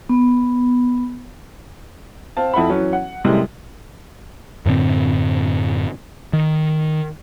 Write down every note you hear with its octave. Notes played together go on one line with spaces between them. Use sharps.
B3
C4 F5 A5
F2 E4 F#5 B5
E3 F#3 C#4
F#5
F#2 A2 C3 G3 G#3
F#2 A2 D3 C4
D#3